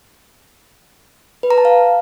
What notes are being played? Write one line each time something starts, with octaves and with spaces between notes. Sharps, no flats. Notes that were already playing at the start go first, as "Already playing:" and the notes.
B4
A#5
A5
F5